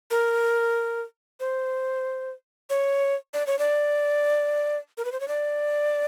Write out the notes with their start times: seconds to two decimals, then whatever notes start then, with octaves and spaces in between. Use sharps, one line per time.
0.11 A#4
1.40 C5
2.70 C#5
3.34 D5
3.47 C#5
3.59 D5
4.98 A#4
5.05 B4
5.12 C5
5.20 C#5
5.28 D5